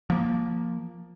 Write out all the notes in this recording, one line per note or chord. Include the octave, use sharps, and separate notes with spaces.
F3 A#3